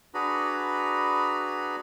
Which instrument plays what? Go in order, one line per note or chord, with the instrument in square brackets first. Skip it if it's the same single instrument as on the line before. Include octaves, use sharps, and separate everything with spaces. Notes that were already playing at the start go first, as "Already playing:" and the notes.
[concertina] D4 F#4 G#4 B4 A#5 B5